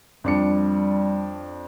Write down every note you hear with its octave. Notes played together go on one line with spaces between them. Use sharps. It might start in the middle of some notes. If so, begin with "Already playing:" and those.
F2 G3 D4 C#7